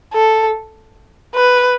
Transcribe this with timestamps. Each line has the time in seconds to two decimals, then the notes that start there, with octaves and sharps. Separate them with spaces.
0.14 A4
1.35 B4